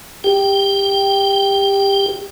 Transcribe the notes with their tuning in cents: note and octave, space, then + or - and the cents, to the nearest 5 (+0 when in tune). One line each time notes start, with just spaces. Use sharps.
G4 +20 G5 +0